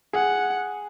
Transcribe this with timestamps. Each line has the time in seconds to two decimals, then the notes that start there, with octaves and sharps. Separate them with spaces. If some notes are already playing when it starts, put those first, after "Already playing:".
0.13 G#4 F#5